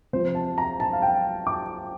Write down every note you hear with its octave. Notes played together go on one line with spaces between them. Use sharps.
C3 F3 C5
A5
A#5
A5
F5
G5
D6